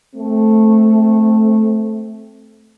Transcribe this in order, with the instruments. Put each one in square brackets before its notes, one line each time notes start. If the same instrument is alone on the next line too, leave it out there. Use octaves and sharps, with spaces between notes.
[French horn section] A3 C4